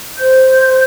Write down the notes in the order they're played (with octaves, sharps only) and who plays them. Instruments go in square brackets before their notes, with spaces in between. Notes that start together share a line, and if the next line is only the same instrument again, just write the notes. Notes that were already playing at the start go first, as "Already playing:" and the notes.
[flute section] C5 G6